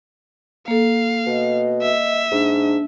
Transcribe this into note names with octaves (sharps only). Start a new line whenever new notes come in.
A#3 A4 F5
B2 D#5
E5
G#2 D4